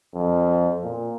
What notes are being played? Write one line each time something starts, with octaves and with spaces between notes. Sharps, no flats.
F2
A#2